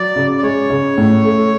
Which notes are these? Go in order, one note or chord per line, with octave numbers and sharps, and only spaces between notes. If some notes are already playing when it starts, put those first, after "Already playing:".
Already playing: F#3 D5
C#3
D5
G#3 C#5
C#3
A2
A3